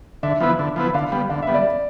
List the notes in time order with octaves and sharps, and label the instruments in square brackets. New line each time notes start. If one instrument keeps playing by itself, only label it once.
[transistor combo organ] D3 [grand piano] E5
[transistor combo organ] F3 B3 E4 B4
D3
F3 B3 E4 B4
[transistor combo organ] D3 [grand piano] F5
[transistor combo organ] G3 B3
[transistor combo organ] D3 [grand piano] F5
[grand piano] E5
[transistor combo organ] G3 B3
[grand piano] D5